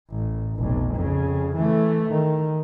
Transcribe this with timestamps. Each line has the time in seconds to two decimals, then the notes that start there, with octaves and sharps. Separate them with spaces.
0.10 A1
0.56 F1 B1
0.94 F2 C#3
1.56 E3 A3
2.10 D#3